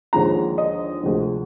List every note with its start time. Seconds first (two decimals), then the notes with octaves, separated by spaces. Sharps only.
0.13 D#2 D3 F3 G#3 A#5
0.58 D#5
1.03 D2 C3 F3 G#3